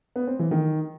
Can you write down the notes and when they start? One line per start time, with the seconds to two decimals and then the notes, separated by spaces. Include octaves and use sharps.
0.16 B3
0.27 C4
0.39 E3
0.51 D#3